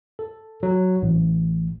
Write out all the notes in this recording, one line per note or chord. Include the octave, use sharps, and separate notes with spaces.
A4
F#3
A1